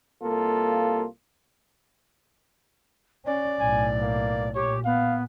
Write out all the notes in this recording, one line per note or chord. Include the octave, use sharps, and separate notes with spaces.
C2 A#3 F4 A4
C#4 D5
B1 A2 G#5
A#3
A#2 G4 C#5
B3 F5